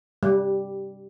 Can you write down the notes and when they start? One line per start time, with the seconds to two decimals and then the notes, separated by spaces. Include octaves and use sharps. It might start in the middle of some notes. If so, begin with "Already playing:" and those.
0.23 G3